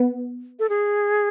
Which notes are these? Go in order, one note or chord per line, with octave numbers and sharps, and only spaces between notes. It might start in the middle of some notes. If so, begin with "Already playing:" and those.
Already playing: B3
A4
G#4